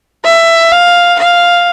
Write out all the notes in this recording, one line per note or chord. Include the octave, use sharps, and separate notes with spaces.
E5
F5
F5